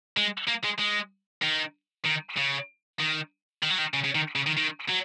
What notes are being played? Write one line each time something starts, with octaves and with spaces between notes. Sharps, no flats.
G#3
A#3
G#3
G#3
D#3
D#3
C#3
D#3
D#3
F#3
D#3
C#3
C#3
D#3
C#3
D#3
D#3
F#3